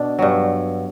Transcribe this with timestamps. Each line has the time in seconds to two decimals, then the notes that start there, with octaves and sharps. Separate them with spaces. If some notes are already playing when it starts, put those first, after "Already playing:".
Already playing: B2 D4
0.19 G2 F#3